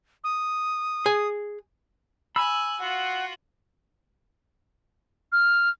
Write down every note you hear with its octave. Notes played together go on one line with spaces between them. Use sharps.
D#6
G#4 G#5
G#5 B5 E6 F#6
F4 F#4 F#5
F6